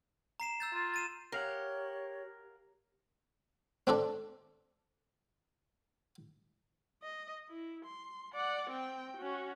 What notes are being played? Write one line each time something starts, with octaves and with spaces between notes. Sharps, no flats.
A#5 C7 E7
E6 G6 A6
F4
A6 D#7 E7
G4 A#4 C#5 F5 F#5
C4 D4 A4 D5
D#5
E4
C6
D5 F#5
C4 G5
C#4 F#4